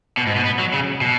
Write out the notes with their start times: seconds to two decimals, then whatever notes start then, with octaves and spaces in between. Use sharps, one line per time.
0.17 B2
0.27 G#2
0.36 B2
0.45 B3
0.59 F#3
0.73 C#3
1.01 B2